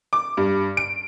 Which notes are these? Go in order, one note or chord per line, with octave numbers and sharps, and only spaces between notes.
D6
G2
D7